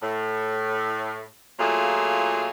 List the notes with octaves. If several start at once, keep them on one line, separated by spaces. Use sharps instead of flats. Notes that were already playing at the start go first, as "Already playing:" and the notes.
A2
A#2 F#3 A3 F4 G#4